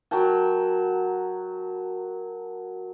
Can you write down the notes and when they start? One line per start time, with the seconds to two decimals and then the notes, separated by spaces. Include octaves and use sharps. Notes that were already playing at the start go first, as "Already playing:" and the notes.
0.11 F#3 A#4 G5 A5